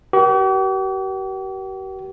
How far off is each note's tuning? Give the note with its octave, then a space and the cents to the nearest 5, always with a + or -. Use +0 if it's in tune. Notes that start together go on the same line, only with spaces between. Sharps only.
G4 -45 A#4 +40